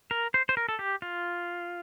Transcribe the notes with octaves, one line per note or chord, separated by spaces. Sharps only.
A#4
C5
C5
A#4
A4
G4
F4